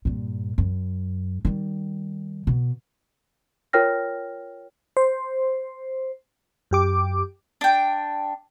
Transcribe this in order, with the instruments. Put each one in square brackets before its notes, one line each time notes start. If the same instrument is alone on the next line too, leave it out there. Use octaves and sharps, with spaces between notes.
[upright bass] G2 A#2
F#2
D#3 G3
B2
[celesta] F4 A#4 C#5 G5 F6 A#6
[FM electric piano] C5
F#2 G4 D6
[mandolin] D4 G5